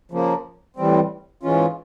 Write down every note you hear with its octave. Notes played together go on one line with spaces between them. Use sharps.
C#3 F3 A#3
A2 E3 G3 C4
G#2 E3 G#3 C#4 F4